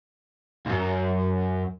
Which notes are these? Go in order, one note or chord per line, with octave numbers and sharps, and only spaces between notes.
C#2 F#2